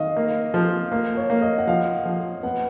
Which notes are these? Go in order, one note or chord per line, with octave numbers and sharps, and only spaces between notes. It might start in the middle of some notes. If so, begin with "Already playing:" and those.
Already playing: D#3 D#5 F5
A#3
F3
A#3
C#5
A#3
D#5
F#5
F3 F5
F3
B3 F#5